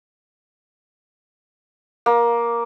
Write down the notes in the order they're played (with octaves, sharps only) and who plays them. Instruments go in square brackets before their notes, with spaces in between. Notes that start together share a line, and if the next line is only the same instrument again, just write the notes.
[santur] A#3